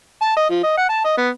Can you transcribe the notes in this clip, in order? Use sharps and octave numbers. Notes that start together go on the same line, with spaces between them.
A5
D#5
F3
D#5
F#5
A5
D#5
B3